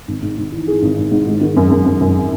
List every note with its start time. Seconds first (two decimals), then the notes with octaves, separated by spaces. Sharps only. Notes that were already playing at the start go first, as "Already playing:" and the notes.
0.08 G#1
0.22 G#2
0.37 G#2
0.52 E3
0.68 E3 G#4
0.82 G#1
0.98 G#1
1.11 G#2
1.27 G#3
1.41 D#3
1.56 F#2
1.71 F#2
1.86 F#2
2.00 F#2